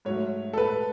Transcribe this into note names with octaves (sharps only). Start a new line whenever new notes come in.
G#2 F#3 A3 C#5
A4
B4